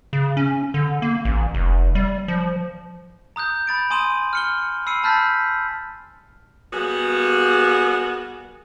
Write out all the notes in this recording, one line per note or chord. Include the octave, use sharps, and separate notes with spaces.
C#3
C#4
D3
A#3
A1
F1
G3
F3
A#5 D#6 F#6 G6
B5 A6 D7
G#5 C6 D#6 D#7 E7 F#7
F6 C#7 G7
B5 E6 C7 C#7 D#7
A5 B5 F6 G6 A6 B6
G3 A#3 B3 F#4 G#4